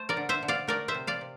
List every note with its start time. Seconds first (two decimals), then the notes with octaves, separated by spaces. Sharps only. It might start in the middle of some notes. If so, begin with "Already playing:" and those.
Already playing: A3 C5
0.09 A#4 D5
0.17 D3
0.29 C5 E5
0.43 D3
0.48 D5 F5
0.67 A3 A#4 D5
0.88 C5 E5
0.94 C3
1.07 D5 F5
1.21 C3